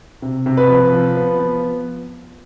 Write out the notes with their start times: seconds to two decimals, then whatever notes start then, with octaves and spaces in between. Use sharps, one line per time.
0.22 C3
0.46 C3
0.57 B4
0.70 F3
0.93 F3
1.17 B3
1.40 F3